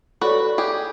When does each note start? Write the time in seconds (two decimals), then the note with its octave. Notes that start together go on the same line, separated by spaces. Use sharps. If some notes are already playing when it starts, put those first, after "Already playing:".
0.21 F#4 A4 B4 C#5 D5
0.58 G4 G#4